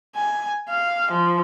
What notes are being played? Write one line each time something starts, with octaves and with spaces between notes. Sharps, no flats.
G#5
F5
F3